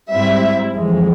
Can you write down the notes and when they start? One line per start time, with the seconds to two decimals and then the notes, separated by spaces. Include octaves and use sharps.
0.12 G#2 G3 C4 E4 E5
0.75 F2 E3 G#3